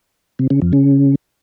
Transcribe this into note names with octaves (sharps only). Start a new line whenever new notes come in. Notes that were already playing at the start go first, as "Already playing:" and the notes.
C3
C#3
F2
C#3